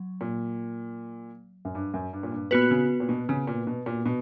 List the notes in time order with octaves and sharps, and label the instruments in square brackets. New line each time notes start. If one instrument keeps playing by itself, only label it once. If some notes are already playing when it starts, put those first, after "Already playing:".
Already playing: [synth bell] F#3
[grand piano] A#2
F#2
G2
F#2
G2
A#2
G2
[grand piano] A#2 [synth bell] B3 F#4 B4
[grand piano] C#3
A#2
B2
C#3
A#2
B2
A#2
B2